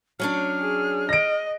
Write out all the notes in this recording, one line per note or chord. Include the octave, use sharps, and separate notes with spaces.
F#3 C#4 D4 F6
G#4
D#5 A#6 D7